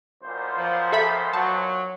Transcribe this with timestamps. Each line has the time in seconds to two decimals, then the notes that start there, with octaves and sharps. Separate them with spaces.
0.23 B1 A#2 C5
0.56 F3
0.92 A4 E5 B5
1.33 F#3 A5